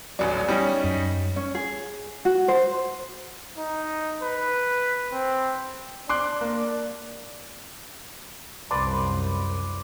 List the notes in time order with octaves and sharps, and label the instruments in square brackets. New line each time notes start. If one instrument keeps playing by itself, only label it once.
[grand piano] D#1 A1 F#3 [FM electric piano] D5
[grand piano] G3 C#4 D#4
[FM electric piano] F#2
[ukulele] C#4
G#4
F#4
C5
[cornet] D#4
B4
C4
[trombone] D4 [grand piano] C6 D6 F#6
[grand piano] A#3
[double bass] C2 F#2 [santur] B4 D5 C6